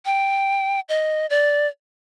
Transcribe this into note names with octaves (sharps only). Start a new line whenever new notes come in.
G5
D#5
D5